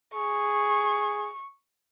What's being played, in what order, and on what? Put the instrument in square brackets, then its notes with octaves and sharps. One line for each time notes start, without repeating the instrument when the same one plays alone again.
[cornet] G#4 [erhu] C#6